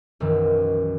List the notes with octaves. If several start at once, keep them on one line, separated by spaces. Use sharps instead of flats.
B1 F#2 D#3 E3